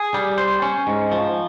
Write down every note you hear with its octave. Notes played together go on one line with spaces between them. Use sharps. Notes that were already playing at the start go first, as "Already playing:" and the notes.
Already playing: G#4
G3
C5
C#4
G#2
F3